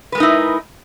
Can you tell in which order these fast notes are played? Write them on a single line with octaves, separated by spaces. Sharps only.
B4 G#3 A#4 D#4 E4